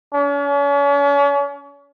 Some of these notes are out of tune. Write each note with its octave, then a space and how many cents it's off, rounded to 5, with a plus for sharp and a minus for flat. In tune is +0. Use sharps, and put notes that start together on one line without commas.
C#4 +40